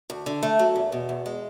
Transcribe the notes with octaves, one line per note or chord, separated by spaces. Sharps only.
D2
D3
A3
F#3
E2
B2
E2
G#3